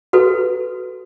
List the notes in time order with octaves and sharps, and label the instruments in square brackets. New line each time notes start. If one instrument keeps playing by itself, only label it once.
[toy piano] F#4 A4 B4